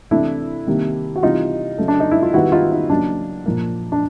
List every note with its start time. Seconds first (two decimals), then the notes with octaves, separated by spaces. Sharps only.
0.11 C3 E3 A3 D4 E4
0.67 C3 D#3 G3 A#3
1.16 F#4
1.22 C3 E3 G3 D#4 F4
1.78 C#3 F#3 A3
1.88 D4
2.00 D#4
2.11 E4
2.23 F4
2.34 D#3 G3 B3 E4 F#4
2.52 D#4 F4
2.72 D#4
2.90 C#3 F#3 A#3 D4
3.46 A#2 F3 A#3
3.92 D4